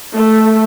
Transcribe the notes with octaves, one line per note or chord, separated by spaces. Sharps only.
A3